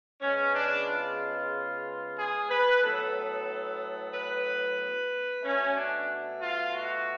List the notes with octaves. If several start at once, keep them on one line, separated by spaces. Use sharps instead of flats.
C#3 G#3 B3 C#4
D4
F4
G#4
B4
A2 F#3 B3 A4
B4
B2 A3 C#4
D4
F4
F#4